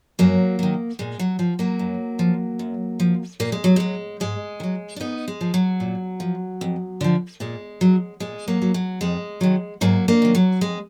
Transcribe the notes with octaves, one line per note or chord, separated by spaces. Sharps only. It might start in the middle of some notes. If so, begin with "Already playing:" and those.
F#2 F#3 A#3
D#3 F#3
A#2 G#3
F#3
F3
F#3 A#3
F#2
F3
F#2
F3
A#2 A#3
G#3
F#3
F#3 G#3
G#2 G#3
D#3
F#3
D4
G#2 B3 D#4
G#3
F3
F#3
A#2
F3
F2
D3 F3
A#2 G#3
F#3
A#2 G#3
F#3 A#3
F#3
F#3
F2 G#3
D#3 F#3
G#2 F#3 A#3
A#3 D4
D#3 F#3
F#3
F2 G#3